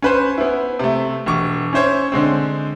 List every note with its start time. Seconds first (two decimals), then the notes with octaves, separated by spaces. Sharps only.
0.02 C#4 B4 C5
0.38 B3 E4
0.79 C3 A3
1.26 E1 C#6 D6
1.73 C#4 E4 C5 C#5
2.12 D3 G#3 C4